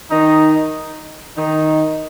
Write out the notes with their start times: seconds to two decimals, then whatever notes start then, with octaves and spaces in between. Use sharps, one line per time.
0.10 D#3 D#4
1.37 D#3 D#4